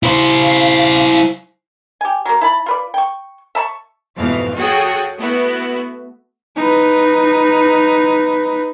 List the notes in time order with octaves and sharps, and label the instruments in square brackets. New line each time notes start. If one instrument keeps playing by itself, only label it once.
[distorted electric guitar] E4 C5 [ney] F5
[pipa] G4 G#5
F#3 A#3
E4 A5 B5
F4 B4 D5
G5 C#6
E5 A5 B5 C#6
[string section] F2 G#2 B2 E3 A3 F5
F#4 G#4 A4 C#5 F#5 G5
A3 B3 E4 F#4
[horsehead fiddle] D#4 B4